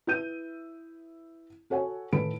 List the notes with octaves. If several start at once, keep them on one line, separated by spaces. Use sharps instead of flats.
E4 B4 G6 D#7
F#4 A4 C#5 F#5 G#5
A2 D#3 A4 B4 B5 D7